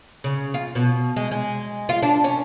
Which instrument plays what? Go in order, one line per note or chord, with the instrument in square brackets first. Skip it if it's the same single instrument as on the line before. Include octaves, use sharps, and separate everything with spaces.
[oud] C#3
F4
B2
G#3
G#3
F4
D4
C#4